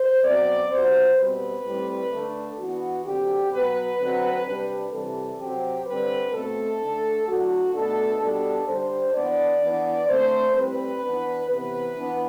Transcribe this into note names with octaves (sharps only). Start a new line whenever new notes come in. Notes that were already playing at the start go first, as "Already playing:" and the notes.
Already playing: C5
B2 F#3 C4 D5
C3 F#3 B3 C5
B2 G3 C4 B4
A2 G3 C4
D3 A3 D4
E3 B3 D4 F#4
D3 F#3 C4 G4
B2 F#3 B3 B4
D3 F#3 C4
C3 G3 D4
C3 E3 G3 C4 A4
C3 F#3 C4 G4
D3 G3 C4 B4
B2 A3 C4 A4
D3 A3 D4
A2 F#3 A3 D4 F#4
B2 A3 D4 A4
B2 G3 D4 A4
D3 G3 D4 C5
E3 B3 D4 D5
E3 B3 D4
D3 A3 C4 C5
A2 G3 C4 B4
E3 B3 D4
C3 E3 B3 B4
E3 B3 D4